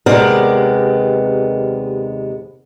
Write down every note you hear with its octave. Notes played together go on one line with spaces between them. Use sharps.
D#2 C3 G#3 B3 A#4 D5